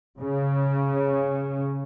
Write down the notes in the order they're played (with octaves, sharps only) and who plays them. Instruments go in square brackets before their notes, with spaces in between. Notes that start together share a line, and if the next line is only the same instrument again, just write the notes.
[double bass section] C#3